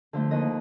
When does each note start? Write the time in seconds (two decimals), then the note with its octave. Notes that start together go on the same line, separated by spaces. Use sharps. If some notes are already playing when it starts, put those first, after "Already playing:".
0.13 D3 F3 A3
0.31 D#2 D#5